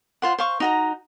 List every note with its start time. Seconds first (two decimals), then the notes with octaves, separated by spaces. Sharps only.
0.22 F4 C5 F#5
0.39 C5 F5 C#6
0.60 D#4 F#4 A#5